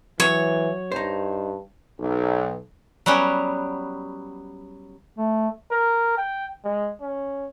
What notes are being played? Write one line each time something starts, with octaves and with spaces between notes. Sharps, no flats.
E3 F#3 C#5
G2 D#4 C5
B1
F#3 G3 B3 C#4 G4
A3
A#4
G5
G#3
C#4